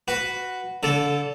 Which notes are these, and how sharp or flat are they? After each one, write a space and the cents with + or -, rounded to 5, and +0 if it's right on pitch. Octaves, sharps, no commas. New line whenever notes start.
F#4 +0 B4 +0
D3 -30 A4 +0